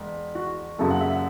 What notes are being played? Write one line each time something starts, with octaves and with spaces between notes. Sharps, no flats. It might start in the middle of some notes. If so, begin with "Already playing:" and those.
Already playing: E1
F#4
F#1 F#2 C#3 F#3 A4
F#5
E5
F#5